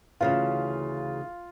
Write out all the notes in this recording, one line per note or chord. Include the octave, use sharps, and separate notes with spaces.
D2 C#3 E3 F4